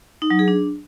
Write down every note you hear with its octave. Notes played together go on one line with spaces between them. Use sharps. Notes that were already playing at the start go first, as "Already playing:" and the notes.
D#4
F#3
G#4
D4